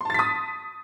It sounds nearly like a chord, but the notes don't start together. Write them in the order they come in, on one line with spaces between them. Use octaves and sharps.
C6 A5 A6 B6 D#6